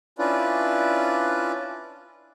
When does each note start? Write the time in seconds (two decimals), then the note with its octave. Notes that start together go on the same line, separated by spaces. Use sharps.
0.19 C#4 D4 E4 F4 B4 D5